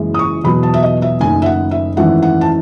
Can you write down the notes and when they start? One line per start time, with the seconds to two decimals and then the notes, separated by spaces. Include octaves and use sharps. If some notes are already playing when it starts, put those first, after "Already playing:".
Already playing: F#1 F#2 E3 G#3
0.14 D#6
0.19 C#6
0.44 E2 B2 F#3 B5
0.63 A5
0.74 E5
0.83 D#5
1.02 E5
1.20 F#1 F#2 D#3 A3 G#5
1.42 E5
1.46 F#5
1.71 E5
1.97 G#1 F#2 E3 A3 F#5
2.23 F#5
2.41 A5